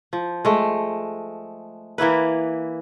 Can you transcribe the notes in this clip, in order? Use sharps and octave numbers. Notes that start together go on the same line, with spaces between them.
F3
G#3 A3
E3 A#3 E4 B4